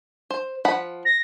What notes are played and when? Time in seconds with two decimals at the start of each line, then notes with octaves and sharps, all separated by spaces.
0.30 C5
0.65 F3 F#5 B5
1.05 A#6